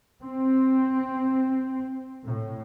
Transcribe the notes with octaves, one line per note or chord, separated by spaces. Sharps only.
C4
A2